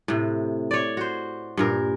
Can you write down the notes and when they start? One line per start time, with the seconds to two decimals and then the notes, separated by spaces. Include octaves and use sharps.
0.08 A2 C3
0.71 C#5 D5
0.97 F#4 C5
1.57 G2 A#2 A#4